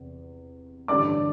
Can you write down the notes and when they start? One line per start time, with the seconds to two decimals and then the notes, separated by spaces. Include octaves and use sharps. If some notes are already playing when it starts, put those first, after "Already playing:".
Already playing: E2 C3
0.88 A1 G2 D3 G3 D5 D6